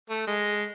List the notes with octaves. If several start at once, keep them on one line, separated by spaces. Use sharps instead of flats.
A3
G#3